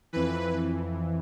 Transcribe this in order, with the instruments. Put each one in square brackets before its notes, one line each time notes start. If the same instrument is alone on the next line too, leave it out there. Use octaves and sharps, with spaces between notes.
[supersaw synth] F2 E3 B4